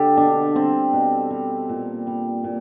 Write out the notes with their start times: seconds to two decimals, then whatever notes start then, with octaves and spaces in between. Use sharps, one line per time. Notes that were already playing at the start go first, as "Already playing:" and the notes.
Already playing: D3 G4 A4
0.17 B2 D4
0.55 G3 C4
0.93 B2
1.30 G3
1.69 A#2
2.07 G3
2.44 A#2